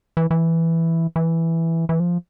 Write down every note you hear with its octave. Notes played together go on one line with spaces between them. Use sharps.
E3
E3
E3
E3
F3